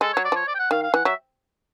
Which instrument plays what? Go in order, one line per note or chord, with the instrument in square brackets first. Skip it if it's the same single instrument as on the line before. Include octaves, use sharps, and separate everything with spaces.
[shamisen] G#3 [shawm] A4
[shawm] C#5
[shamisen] F#3
[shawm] D5
[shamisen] F3 [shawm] C#5
[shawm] D5
G5
F#5
[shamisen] D#3 [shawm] F5
[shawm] F5
[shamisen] E3 [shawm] F#5
[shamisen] F#3 [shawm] E5